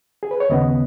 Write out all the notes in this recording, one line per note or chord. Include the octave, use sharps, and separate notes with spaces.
G#4
B4
C#5
D#2 C#3 B3 D#5